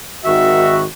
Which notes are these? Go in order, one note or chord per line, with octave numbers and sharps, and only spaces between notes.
G#1 D#3 F#4 E5